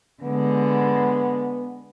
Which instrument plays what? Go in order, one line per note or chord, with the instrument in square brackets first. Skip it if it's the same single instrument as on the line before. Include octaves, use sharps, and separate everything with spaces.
[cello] D3 G#3 [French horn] B3